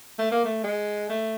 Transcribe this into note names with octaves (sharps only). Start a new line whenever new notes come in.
A3
A#3
A3
G#3
A3